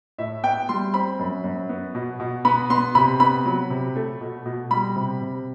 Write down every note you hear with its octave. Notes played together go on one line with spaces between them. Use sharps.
A2 E5
B3 G5
G3 C6
C4 B5
F#2
F#2
B3
B2
B2
B3 B5
B3 C6
C3 B5
B3 B5
F#3
C3
A3
B2
B2
G3 B5
C3
C3